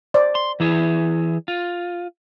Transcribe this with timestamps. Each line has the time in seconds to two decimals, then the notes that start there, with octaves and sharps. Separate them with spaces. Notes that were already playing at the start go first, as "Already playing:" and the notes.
0.14 C5 D5
0.35 C6
0.60 E3 E4 G#4
1.48 F4